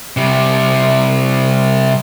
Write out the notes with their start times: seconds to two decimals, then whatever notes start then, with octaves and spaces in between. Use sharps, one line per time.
0.17 C3 G3